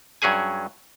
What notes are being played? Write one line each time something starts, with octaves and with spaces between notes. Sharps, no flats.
G2 F#3 C#4 G#4 G#5